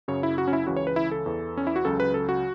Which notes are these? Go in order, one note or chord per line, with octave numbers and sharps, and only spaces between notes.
F#2 C#3 F#3 C#5
E4
F#4
C#4
E4
C#2 C#3 E3 F#4
C#5
B4
E4
A4
E2 E3
C#4
E4
F#4
C#2 C#3 F#3 A4
B4
A4
F#4